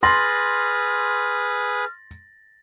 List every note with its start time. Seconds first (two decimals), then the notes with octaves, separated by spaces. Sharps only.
0.03 G#4 B4 C6 F6 A6 A#6 F#7